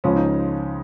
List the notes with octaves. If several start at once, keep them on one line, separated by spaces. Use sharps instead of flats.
C#2 C#3 F3 G#3 C#4
D#4